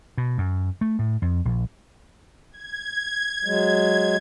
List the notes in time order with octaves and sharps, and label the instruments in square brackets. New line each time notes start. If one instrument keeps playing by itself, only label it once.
[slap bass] B2
F#2
A3
A2
F2
A#1
[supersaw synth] G#6
[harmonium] F#3 G#3